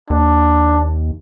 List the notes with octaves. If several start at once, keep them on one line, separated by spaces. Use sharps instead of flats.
D#2 D4